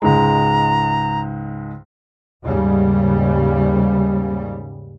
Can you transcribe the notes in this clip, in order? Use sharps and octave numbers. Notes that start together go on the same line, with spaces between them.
C#2 G#2 G#3 A#5
D#2 G#2 C#3 G3